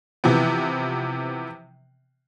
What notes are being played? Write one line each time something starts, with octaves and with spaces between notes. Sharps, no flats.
C3 E3 F3 B3